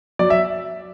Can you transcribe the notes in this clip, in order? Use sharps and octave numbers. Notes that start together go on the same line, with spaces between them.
F#3 D5
E5